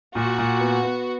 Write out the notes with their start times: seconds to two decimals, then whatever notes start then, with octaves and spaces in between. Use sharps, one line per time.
0.15 A#2 F#4
0.38 A#2
0.60 B3
0.83 B3